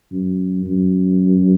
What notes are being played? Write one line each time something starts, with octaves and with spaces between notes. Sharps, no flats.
F#2
F#2